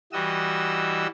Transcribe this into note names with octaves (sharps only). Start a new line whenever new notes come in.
E3 G3 F#4 D#5 E6